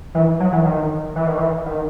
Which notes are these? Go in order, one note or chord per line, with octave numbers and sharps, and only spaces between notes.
E3
F#3
E3
D#3
E3
D#3
E3
D#3